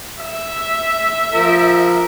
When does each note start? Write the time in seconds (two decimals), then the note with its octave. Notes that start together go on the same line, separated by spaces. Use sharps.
0.21 E5
1.33 F3 A#4